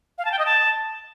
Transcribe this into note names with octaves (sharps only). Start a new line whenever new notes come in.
F5
A5
G5
D#5
A5